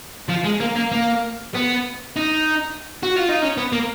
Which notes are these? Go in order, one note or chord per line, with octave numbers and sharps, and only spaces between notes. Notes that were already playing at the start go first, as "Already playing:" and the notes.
F3
G#3
A#3
A#3
A#3
B3
D#4
F#4
F4
D#4
C#4
B3
A#3